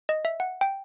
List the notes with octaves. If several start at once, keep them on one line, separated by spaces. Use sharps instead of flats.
D#5
E5
F#5
G5